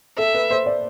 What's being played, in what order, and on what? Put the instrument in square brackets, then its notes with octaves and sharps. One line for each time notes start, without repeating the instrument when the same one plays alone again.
[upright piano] A4 [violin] E5
[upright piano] B4
C5
D5